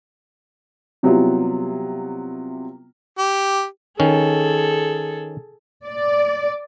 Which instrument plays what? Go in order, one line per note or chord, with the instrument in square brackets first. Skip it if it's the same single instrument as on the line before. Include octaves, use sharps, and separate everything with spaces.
[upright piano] C3 F#3 G3 B3 E4 F4
[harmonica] G4
[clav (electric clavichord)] D#3 C#4 [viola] G#4 A4
[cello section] D5